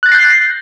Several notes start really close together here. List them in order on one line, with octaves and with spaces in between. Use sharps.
F#6 A6 A#6 C7 G6